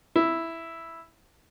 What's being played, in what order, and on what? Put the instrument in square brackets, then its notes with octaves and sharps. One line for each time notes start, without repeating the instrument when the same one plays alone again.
[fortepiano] E4